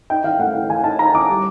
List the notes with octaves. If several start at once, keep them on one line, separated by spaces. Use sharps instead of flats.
D#4 G5
E3 F5
A3 F#5
E3 F#5
E3 G#5
D#4 A5
D#4 A#5
E3 D6
G3